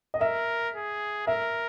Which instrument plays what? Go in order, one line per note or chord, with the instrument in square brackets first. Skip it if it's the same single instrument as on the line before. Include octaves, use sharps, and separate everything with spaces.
[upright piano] D#5
[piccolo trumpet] A#4 [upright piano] E5
[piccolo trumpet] G#4
[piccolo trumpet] A#4 [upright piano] E5